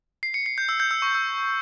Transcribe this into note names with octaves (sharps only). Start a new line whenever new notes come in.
C7
C#7
C7
G6
E6
G6
E6
C#6
E6